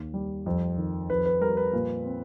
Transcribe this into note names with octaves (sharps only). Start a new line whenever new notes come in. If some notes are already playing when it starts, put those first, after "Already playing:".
Already playing: D#2
G3
F2
D#3
F2 B4
B4
G3 A#4
B4
A#2
C4